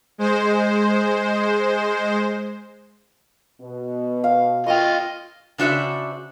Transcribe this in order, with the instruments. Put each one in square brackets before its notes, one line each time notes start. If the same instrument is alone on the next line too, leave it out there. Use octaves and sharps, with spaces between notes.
[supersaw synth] G#3 C5
[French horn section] B2
[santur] F5
[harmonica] F4 D#5 F5 [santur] G5 C6 C#6
[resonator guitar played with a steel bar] C#3 D4 F#4 C5 E5